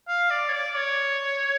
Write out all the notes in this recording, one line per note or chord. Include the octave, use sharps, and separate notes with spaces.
F5
D5
C#5
D5
C#5